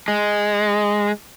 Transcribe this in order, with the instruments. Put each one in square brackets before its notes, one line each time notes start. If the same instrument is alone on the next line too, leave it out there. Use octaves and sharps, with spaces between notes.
[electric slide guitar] G#3